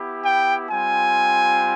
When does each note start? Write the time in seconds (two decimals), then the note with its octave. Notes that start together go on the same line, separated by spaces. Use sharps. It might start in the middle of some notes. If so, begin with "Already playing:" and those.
Already playing: B3 E4 G4
0.24 G5
0.69 G3 C4 F4 G#5